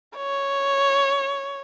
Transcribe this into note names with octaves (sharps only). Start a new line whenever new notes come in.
C#5